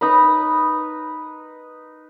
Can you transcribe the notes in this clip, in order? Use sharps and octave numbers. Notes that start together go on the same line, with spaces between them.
D#4 B4 A#5 B5